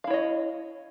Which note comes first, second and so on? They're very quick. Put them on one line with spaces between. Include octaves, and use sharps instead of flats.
F5 E4 C#5 D#5